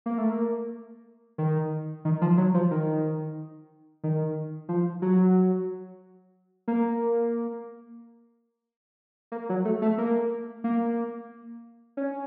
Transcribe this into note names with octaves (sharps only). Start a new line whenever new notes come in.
A#3
A3
A#3
D#3
D#3
F3
F#3
F3
D#3
D#3
F3
F#3
A#3
A#3
F#3
A3
A3
A#3
A#3
C#4